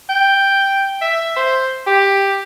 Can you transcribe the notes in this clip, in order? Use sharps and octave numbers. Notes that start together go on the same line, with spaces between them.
G5
E5
C5
G4